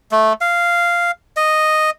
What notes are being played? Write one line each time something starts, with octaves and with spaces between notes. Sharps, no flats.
A3
F5
D#5